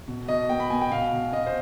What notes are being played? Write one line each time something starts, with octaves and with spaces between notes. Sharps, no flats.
B2
B2 D#5
B3 G5
B5
B3 G#5
G5
B2 F5
B2
B2 D#5
C5